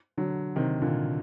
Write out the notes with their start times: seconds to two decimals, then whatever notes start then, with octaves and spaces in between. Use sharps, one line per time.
0.18 D3 F#3
0.56 C3 D#3
0.82 A#2 D3